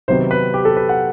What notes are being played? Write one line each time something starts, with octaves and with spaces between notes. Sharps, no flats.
C3 D#3 F#3 B3 D#4 C5
B4
G4
A4
B4
F#5